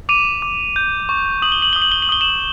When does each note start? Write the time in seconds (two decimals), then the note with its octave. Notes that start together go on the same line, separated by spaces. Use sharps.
0.09 D6 D#7 F7
0.42 D6
0.76 G6
1.09 C#6
1.42 D#6 F#7
1.52 G7
1.62 F#7
1.73 D#6 G7
1.82 F#7
1.92 G7
2.02 F#7
2.09 D#6 G7
2.21 E7 F#7